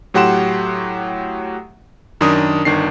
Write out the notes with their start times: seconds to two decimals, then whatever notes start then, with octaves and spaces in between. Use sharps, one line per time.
0.14 A2 F#3 G4 F#5 C6 E7
2.21 F#2 D#3 D4 D#6
2.65 G1 D#3 D4 C7